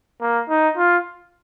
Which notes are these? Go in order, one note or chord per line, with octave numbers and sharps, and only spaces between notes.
A#3
D#4
F4